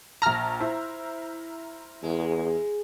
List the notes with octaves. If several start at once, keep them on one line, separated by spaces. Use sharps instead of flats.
A#1 A5 A#5 F6
E4 C5
E2 G#3